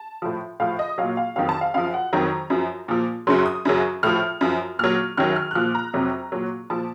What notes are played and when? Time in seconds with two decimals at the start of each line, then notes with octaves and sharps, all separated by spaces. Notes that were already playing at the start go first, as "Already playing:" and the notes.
Already playing: A5
0.22 A2 F3
0.60 A2 F3 F5
0.79 D#5
0.98 A#2 F#3 F5
1.17 F5
1.36 F2 D#3 F#3 F5
1.49 A5
1.61 F5
1.74 F#2 F3 F5
1.94 F#5
2.13 F2 D#3 F#3 A#5
2.50 F#2 F3
2.88 A#2 F3
3.27 F#2 C#3 F#3 C6
3.46 D#6
3.65 F#2 C#3 F#3
4.03 A2 F3 F6
4.41 F#2 F3
4.79 A#2 F#3 F6
5.17 F#2 D#3 F#3 F6
5.36 F6
5.51 F#6
5.55 A#2 F3 F6
5.75 A#5
5.94 F2 C3 F#3
6.32 A#2 F#3
6.70 A#2 F3 A5